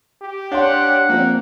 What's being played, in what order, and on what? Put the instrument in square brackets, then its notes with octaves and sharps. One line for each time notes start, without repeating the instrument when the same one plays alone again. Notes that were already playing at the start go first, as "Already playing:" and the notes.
[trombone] G4
[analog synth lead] D4 [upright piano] C#5 F5 C6 [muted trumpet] F#5
[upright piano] F3 C4 [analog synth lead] A#3